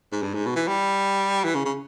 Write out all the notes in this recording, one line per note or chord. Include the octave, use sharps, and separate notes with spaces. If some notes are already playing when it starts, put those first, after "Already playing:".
G#2
G2
G#2
B2
E3
G3
E3
C#3
C#3